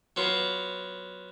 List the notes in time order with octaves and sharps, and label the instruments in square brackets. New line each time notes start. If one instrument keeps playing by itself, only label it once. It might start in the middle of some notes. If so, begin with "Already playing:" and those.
[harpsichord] F#3 B3 F4